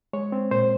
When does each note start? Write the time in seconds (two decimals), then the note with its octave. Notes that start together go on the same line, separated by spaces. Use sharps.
0.13 G#3 C#5
0.32 C4
0.51 A#2 C5